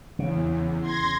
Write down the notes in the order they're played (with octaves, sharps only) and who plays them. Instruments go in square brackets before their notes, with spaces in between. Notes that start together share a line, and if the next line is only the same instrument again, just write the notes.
[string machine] E2 [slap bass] C#3
[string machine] C6 G#6 A#6